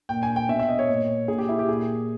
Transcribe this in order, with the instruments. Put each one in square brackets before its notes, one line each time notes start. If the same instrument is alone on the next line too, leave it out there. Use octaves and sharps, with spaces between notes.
[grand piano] A#2 G5
G#5
G5
B2 E5
E5
D#5
C#5
A#2
A#2 G#4
G4
E4
G4
A#2 G#4